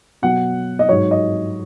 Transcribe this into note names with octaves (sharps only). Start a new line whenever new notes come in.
B2 F#3 F#5
D#5
G#2 F#3 C#5
D#5